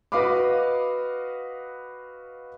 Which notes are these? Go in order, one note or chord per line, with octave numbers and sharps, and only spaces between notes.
F#4 B4 D#5 F5 B5 D6